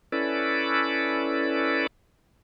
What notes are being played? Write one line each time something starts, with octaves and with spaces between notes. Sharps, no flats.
C#4 E4 A4 B4 D5